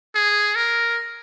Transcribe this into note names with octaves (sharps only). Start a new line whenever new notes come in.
G#4
A#4